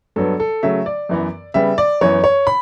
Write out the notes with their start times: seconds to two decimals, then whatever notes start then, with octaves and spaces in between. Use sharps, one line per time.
0.16 G2 F#3 B3 A4
0.40 A4
0.63 C#3 F#3 A3 E5
0.86 D5
1.09 F#2 E3 B3
1.54 C#3 G3 B3 E5
1.78 D5
2.01 F#2 E3 B3 C#5
2.24 C#5
2.47 B5